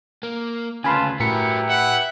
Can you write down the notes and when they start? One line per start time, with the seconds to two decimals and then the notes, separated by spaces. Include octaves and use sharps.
0.23 A#3
0.84 D2 C#3 F4 B4 G#5 A5 B5 C6
1.20 A2 E4 F#4 G4 A#4 B4 B6 C#7
1.69 E5 F#5